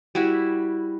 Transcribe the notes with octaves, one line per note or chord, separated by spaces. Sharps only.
G3 E4 F#4 E5